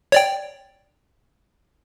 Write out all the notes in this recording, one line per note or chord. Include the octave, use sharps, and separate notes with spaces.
C#5 D5 G5